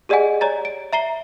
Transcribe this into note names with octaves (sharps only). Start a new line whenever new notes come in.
G4 G#4 D5 D#5 F#5 G#5
C#5 D5 A#5 A6
D7
E5 A#5 C7 G7